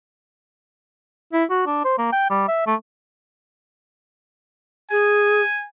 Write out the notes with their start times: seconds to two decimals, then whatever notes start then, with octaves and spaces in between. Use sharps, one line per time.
1.33 E4
1.50 F#4
1.66 D4
1.85 C5
1.98 A#3
2.12 G5
2.30 G3
2.48 E5
2.66 A3
4.91 G#4 G#5